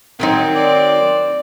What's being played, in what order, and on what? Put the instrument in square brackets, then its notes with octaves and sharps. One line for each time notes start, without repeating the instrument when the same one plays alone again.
[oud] D#3 F#3 D#4 [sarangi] C4
[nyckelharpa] D5